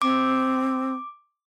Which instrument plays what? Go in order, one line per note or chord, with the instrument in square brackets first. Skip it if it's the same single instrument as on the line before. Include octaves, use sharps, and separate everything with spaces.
[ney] C4 [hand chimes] D6